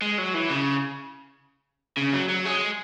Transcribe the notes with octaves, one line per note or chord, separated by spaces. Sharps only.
G#3
F#3
E3
C#3
C#3
F#3
F#3
G#3